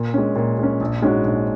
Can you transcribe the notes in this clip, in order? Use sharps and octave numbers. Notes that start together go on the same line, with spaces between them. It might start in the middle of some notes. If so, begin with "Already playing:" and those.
Already playing: A#2
G#3 C#4
A#2
G#3 C#4
A#1
G#2 G#3 C#4 F#4
A#1